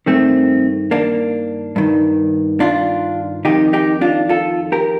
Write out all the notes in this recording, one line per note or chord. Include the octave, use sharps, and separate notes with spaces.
G2 D#3 A3 C4
A#3 D4
G2 D#3
D4 F4
F2 D#3 D#4 G4
D#4 G4
D4 F4
F4 A4
G4 A#4